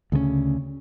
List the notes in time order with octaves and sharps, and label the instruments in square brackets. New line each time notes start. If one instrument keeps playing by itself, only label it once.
[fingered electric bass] D2 C#3 G3 C#4